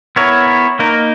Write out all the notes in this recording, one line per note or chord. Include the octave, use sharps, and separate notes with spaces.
B3 E4 A#4 C#5
A#3 D#4 A#4